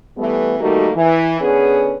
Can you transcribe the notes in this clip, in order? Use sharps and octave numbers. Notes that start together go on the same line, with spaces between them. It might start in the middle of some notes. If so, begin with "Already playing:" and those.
E3 G3 A3 B3
D#3 G3 A3 A#3 D#4 F#4
E3
D3 B3 C#4 G#4 B4